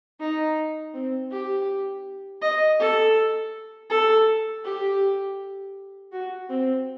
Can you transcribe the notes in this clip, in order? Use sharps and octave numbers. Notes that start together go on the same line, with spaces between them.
D#4
C4
G4
D#5
A4
A4
G4
F#4
C4